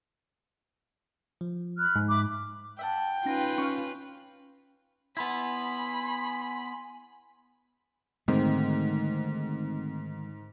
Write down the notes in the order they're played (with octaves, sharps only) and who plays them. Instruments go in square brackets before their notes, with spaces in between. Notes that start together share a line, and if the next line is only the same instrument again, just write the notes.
[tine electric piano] F3
[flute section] B5 F6 F#6
[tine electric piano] G#2
[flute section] E5 B5 D6
[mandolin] E5 F#5 A5 [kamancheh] G5
[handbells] C#4 D#4 A#6 [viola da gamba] F4 B4
[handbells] C#4 [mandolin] F5 C#6
[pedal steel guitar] B3 E4 [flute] G#5 [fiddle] B5 [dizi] C6
[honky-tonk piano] G#2 [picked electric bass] D3 D#3 G#3 [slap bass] A3 [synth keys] C4